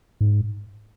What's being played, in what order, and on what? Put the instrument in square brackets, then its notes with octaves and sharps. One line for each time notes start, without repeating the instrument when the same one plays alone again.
[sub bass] G#2